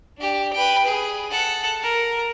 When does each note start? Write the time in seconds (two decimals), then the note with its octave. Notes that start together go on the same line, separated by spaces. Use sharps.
0.18 D4 G4
0.53 B4 G5
0.86 G#4
1.31 A4 F#5
1.83 A#4